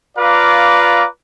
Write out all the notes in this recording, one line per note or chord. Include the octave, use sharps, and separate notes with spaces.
F4 B4 D5 F5 A#5 D6